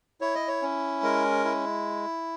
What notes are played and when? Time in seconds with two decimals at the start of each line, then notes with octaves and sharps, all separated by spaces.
0.21 E4 C#5
0.35 D#5
0.48 C#5
0.62 C#4
1.03 G#3 A#4
1.45 E4